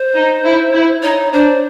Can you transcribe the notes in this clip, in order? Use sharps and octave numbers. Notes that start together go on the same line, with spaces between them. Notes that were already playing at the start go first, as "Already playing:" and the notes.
Already playing: C5
D#4
E4
E4
D#4 C#5
D4 C5